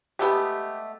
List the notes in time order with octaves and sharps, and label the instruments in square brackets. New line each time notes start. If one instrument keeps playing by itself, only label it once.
[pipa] G#3 A3 B3 [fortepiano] G4